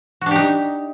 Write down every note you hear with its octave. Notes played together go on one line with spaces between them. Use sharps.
D4 D#4 F#4 G4